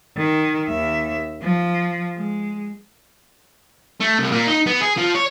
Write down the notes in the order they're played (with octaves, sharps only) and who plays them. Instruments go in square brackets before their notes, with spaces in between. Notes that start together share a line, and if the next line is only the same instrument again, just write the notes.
[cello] D#3
D#2 E5
F3
G#3
[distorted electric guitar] A3
C2
A#2
D#4
B3
G#4
F3
C#5